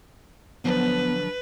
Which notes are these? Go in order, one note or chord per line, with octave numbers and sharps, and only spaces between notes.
D3 F3 F#3 B3 B4